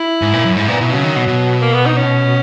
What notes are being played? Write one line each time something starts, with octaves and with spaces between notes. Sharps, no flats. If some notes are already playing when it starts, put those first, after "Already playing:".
Already playing: E4
G#2
A#2
F#2
G#2 E4
A#2 B3
B2 E4
C#3 F#3
D#3
B2
B2
A#3
B3
D#4
C#4